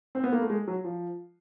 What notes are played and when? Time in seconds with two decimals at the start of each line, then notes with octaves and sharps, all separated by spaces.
0.15 C4
0.24 B3
0.32 A#3
0.41 A3
0.50 G#3
0.67 F#3
0.84 F3